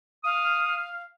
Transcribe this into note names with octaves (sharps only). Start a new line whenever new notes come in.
F5 D#6